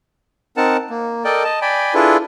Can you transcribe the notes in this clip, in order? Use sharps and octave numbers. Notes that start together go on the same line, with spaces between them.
C4 D#4 A#4 F#5 A5
A#3
A4 A#4 D5 D#5 G5
D#5 A5
D5 G5 G#5 B5
D4 E4 F4 G#4 A4 B4